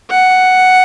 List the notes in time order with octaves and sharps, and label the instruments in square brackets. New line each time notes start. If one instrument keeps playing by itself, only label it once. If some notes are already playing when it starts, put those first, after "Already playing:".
[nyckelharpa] F#5